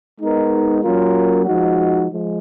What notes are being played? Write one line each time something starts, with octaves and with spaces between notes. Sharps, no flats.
G#3 B3 D#4 A#4
F#3 A#3 C#4 F4 A#4
F3 G#3 D#4 F#4
F3 G#3